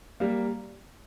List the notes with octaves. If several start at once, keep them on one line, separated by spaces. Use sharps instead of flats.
G3 A#3